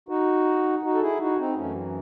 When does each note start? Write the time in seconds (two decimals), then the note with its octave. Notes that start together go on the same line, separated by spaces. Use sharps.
0.09 D#4 F#4
0.83 D#4 F#4
0.95 A4
1.01 E4 G#4
1.19 D#4 F#4
1.38 C4 D#4
1.56 F#2 E3 A3 C#4